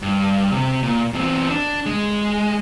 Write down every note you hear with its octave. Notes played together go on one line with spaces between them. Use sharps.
G2
C3
A#2
E2 C4
D4
G#3